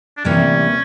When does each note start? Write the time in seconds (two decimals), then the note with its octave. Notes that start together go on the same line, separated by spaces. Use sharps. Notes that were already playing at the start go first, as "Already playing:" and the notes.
0.17 D4
0.25 D2 C3 E3 G3 A#3 C#4